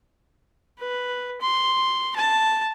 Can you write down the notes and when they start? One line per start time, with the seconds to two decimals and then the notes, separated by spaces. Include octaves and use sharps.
0.78 B4
1.41 C6
2.16 A5